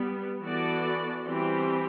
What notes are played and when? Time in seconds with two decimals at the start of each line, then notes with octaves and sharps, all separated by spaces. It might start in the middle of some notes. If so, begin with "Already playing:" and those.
Already playing: G3 B3
0.41 E3 B3 F#4 A4 D5
1.25 E3 G3 C4 G4